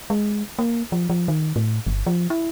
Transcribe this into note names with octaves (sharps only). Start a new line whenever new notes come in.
G#3
A#3
F3
F3
D#3
A2
G1
F3
E4